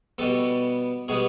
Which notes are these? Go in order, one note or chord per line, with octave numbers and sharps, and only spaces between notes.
B2 G3 B3 A4
B2 G3 B3 G#4